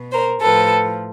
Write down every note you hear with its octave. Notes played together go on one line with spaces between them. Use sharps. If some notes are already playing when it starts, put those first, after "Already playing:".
Already playing: B2
A#4 C5
A2 F3 A4 B4